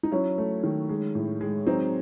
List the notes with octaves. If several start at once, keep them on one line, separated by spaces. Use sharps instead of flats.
D#4
F#3 C#4 E4
A3
D#3
G#3
A2
G#3
F#3 C4 D#4